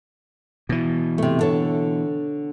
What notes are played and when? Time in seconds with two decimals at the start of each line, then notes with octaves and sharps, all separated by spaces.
0.69 B2 E3
1.18 C3 A3
1.39 D3 A4 C#5